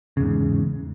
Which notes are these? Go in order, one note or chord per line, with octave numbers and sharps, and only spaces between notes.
E2 G#2 C#3